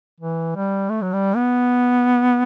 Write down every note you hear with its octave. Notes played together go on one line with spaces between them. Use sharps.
E3
G3
A3
F#3
G3
B3